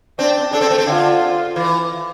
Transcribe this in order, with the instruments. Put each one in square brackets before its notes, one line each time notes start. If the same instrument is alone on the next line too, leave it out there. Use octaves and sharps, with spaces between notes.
[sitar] C4 [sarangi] D4
[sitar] D4 [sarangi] A4
[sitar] C4
A3
C4
[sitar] D3 [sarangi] F4
[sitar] E3